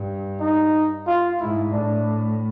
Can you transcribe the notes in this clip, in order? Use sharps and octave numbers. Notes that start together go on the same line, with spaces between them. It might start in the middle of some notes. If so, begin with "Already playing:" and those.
Already playing: G2
D#4
F4
G#2 E4
A2 D4